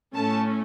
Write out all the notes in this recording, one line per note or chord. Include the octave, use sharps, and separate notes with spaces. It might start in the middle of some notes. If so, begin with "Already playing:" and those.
A2 A3 C#4 A5